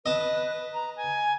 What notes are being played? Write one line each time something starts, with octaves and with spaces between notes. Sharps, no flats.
B4 D#5 A5
A#5
G#5